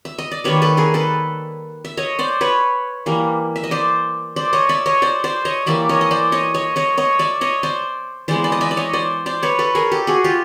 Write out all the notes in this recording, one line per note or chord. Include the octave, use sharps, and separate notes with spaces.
E5
D#5
D5
D#3 G3 A#3 B4 C#5
A4 B4
G#4 A#4
A4 B4
E5
C#5 D#5
C5 D5
B4 C#5
E3 G3 A#3
E5
D#5
C5 D5
C5 D5
C#5 D#5
D5 E5
C#5 D#5
C5 D5
C5 D5
C#5 D#5
E3 G3 A#3 D5 E5
C#5 D#5
D#5
C5 D5
C#5 D#5
C#5 D#5
C#5 D#5
C#5 D#5
D5 E5
C#5 D#5
C5 D5
E3 G#3 B3 C5 D5
D5
D#5
D5 E5
D5
C#5 D#5
C5 D5
C5 D5
B4 C#5
A4 B4
G#4 A#4
G4 A4
F#4 G#4
F4 G4